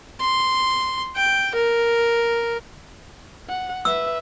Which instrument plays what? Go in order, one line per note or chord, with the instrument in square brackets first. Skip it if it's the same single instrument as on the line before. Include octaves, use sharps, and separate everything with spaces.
[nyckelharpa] C6
G5
A#4
[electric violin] F#5
[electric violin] B4 E5 [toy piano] E6